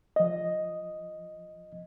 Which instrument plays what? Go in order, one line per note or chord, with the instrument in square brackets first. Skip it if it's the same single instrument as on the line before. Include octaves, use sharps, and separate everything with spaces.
[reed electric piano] F3 D#5